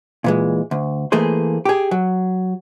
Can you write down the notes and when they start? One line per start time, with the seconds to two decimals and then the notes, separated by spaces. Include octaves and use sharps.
0.24 A#2 E3 G#3
0.71 D2
1.12 E3 A3 A#3 G#4 C5
1.65 G4 G#4
1.91 F#3